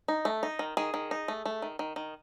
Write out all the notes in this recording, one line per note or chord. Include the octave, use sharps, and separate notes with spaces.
D#4
A3
D#4
D#3
D#3 G#4
D#3
D#4
A3
A3
D#3
D#3
D#3